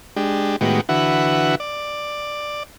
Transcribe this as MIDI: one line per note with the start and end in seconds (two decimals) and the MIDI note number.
0.16 0.56 56
0.16 0.56 62
0.16 0.56 67
0.61 0.81 45
0.61 0.81 51
0.61 0.81 56
0.61 0.81 59
0.61 0.81 66
0.61 0.81 67
0.89 1.55 50
0.89 1.55 52
0.89 1.55 66
0.89 1.55 71
0.89 1.55 76
0.89 1.55 78
1.60 2.63 74